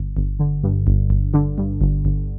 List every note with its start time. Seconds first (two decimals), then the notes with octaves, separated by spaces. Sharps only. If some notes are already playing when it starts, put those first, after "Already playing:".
Already playing: G1
0.17 G1
0.39 D3
0.63 G2
0.87 G1
1.10 G1
1.34 D3
1.58 G2
1.81 G1
2.05 G1